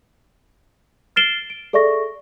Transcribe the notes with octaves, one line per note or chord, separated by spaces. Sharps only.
F6 A6 C7 D7 E7 G7
D7
G#4 A4 D5 E5 C#6 A#6